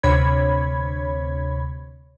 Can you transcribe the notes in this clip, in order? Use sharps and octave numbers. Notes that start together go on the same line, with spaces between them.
D2 C3 C#5 B5 G#6